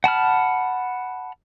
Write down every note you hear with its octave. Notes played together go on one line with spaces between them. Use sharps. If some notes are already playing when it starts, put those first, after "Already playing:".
F#5 A5 B5 F6